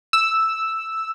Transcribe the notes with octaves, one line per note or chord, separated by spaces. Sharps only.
E6